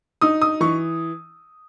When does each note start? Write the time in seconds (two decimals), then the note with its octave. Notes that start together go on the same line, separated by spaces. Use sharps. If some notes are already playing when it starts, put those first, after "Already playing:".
0.21 D#4 D#6
0.42 D#6
0.61 E3 C#6